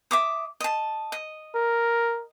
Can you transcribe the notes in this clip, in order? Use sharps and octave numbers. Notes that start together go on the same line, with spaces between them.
E5 D6 D#6
D#5 A5
D#5
A#4